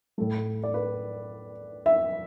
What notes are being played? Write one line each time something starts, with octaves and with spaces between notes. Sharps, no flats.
A2 A3 A4
D5
B4
E5